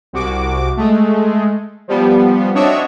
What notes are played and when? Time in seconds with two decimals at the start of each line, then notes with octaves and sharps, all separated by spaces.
0.13 C2 F#4 D6
0.77 G#3 A3
1.88 F3 G3 B3
2.54 C4 D4 F#4 C#5 D#5 E5